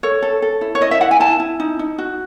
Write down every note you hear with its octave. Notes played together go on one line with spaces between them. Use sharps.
A4 C#5
A4
A4
E4
C#5
E4 D#5
E5
E4 F#5
G#5
E4 A5
E4
D#4
D#4
F#4